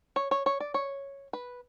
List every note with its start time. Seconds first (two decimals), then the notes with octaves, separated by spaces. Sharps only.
0.16 C#5
0.31 C#5
0.46 C#5
0.60 D5
0.74 C#5
1.33 B4